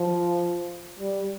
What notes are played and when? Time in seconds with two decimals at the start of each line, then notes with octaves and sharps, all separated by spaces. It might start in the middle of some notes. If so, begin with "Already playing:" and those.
Already playing: F3
0.99 G3